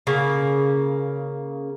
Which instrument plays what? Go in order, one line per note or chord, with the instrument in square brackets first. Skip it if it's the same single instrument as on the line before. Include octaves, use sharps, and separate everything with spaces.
[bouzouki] C#3 A#3